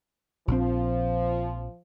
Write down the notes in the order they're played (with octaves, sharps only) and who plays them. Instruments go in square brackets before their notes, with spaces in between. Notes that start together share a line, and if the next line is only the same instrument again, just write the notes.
[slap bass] A#1 C4 [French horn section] F3